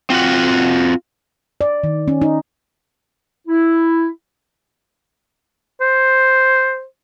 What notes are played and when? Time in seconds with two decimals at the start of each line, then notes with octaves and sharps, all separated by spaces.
0.10 C4 F4 F#4 F#5
1.61 D5
1.84 D#3
2.08 C#4
2.22 D#4
3.48 E4
5.81 C5